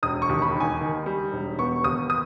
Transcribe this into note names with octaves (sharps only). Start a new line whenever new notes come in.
E1 D#6
C#6
D#2
B5
D#3
G#5
D#3
G3
E1
B3 C#6
D#2 D#6
D#6